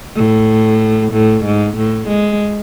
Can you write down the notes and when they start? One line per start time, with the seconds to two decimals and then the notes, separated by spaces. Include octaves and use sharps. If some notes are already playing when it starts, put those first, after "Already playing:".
0.16 A2
1.13 A2
1.45 G#2
1.77 A2
2.08 G#3